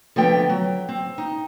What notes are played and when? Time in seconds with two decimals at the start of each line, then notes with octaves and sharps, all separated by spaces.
0.16 D3 F3 A3 B3 G5
0.49 F#3
0.89 C4
1.18 D#4